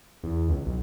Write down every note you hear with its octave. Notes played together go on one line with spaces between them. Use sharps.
E2
C#2
B1